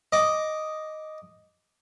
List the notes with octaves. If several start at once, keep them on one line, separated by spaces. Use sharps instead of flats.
D#5 D6